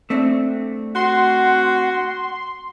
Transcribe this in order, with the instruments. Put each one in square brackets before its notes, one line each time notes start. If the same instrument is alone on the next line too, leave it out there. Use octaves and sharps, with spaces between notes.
[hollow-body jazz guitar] A3 C4 D4
[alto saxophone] F#4 [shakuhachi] F#5 [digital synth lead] C6